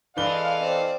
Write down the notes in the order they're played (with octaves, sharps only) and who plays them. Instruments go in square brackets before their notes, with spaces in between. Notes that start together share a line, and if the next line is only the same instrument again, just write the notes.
[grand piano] E3 B4 G7 [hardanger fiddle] G#3 D5 [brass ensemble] A4 D#5 F5
[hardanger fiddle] C4 D5